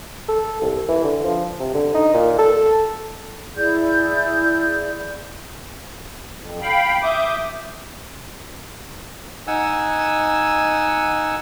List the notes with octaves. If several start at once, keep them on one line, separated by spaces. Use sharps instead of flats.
A4
C2
E3
D3
F3
C3
D3
D#4
A#2
A4
E4 G#4 D5 G6
F2
F5 G5 B5
E5 D6 D#6 G6
D#4 F#5 G#5 E6